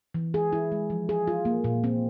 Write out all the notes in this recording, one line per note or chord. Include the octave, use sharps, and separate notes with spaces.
E3
G#4
E4
G#3
F3
G#4
F4
A#3
A#2
C4